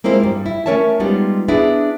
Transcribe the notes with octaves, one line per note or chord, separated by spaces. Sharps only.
G#3 A#3 C4 E4 C5
G2 G3
E4
A3 C#4 A#4 C#5 E5 A5
G3 G#3 B3 D#4 F4 G4
B3 D4 E4 G#4